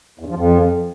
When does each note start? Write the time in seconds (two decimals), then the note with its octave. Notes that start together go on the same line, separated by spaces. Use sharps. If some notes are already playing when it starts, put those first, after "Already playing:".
0.19 E2
0.25 G2
0.30 F3
0.35 F2